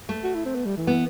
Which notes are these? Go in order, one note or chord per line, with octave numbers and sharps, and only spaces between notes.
A3
F#4
E4
C4
B3
G3
E3
B3